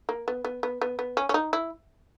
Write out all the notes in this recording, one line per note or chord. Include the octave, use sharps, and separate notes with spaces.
A#3
B3
B3
B3
B3
B3
C#4
C#4
D#4
E4